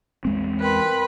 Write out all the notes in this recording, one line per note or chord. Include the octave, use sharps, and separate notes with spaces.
E2 G#3 C4
A#4 B4 G5 B5 C6